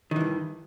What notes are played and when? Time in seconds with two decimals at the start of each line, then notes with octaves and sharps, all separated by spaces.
0.11 D#3
0.16 E3
0.21 G2